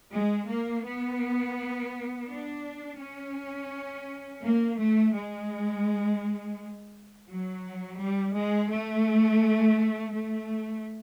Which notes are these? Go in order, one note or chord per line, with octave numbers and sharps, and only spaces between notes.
G#3
A#3
B3
D4
C#4
A#3
A3
G#3
F#3
G3
G#3
A3
A3